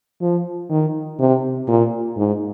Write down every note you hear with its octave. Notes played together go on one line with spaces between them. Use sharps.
F3
D#3
C3
A#2
G#2